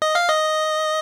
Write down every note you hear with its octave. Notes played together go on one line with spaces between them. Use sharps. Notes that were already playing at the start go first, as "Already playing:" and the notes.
D#5
F5
D#5